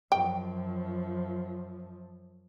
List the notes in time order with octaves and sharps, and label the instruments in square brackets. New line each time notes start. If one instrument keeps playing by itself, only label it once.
[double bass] F#2 F3 [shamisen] G5